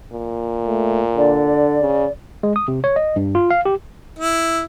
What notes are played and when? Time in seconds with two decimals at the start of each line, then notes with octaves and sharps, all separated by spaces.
0.13 A#2
0.66 A3
1.17 D3 D5
1.81 C#3
2.43 G#3
2.56 D#6
2.68 C3
2.84 C#5
2.96 D#5
3.16 G2
3.35 F4
3.51 F5
3.65 G4
4.19 E4